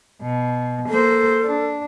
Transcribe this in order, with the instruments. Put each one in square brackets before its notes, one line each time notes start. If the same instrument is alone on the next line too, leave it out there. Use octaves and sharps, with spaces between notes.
[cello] B2
[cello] A#3 C5 [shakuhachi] A4
[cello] D4